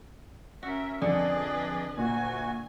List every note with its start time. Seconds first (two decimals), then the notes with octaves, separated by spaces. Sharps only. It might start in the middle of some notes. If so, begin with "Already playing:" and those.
0.63 C#4 F#4 A#4 E5
1.02 F2 D3 G#4 B4 D5 D#5
1.98 D2 A#2 F#4 G#5